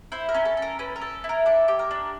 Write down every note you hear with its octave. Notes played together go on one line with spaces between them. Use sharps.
E4 C5
A#4
C#4
A4
A4
A#4
C#4 B4
A#4
A4
E4
A#4
D4 A4
G4
A#4
D4